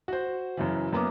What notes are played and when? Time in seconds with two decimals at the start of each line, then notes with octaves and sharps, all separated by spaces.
0.08 F#4 C5
0.57 F#2 C#3 E3
0.93 F#2 A#3 B3 D6 D#6